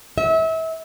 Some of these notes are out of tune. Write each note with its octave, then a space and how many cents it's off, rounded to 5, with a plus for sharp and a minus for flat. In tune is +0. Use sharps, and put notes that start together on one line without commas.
E5 -30